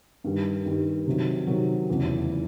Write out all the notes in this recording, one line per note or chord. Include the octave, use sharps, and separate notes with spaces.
G2 D#3 G3
G2 D#3 G3
C3 D#3 F#3
C3 D#3 F#3
F1 E2 C#3